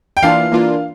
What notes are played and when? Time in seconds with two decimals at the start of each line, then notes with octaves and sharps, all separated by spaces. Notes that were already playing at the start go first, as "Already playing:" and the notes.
0.17 G5
0.23 E3 A#3 D4 F4 F5
0.52 E3 A#3 D4 F4